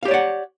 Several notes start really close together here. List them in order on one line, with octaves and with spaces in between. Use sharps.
F5 G4 C#5 D5 F#5